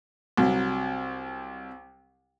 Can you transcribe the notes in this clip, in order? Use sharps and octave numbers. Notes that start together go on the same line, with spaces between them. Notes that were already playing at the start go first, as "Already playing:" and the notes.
C2 F#3